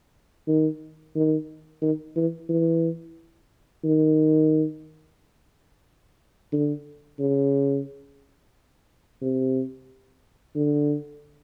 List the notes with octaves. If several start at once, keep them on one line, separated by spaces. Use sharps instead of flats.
D#3
D#3
D#3
E3
E3
D#3
D3
C#3
C3
D3